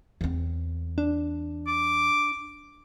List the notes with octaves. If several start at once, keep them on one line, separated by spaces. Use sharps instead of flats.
E2 C4
D4
D6